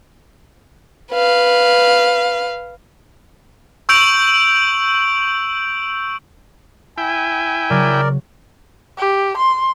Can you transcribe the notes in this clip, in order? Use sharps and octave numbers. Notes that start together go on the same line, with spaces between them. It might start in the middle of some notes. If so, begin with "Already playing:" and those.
B4 F5
C#6 E6 G6 D7 F7 F#7
E4 G5 G#5
C#3 F#3 A#4 D5
G4
C6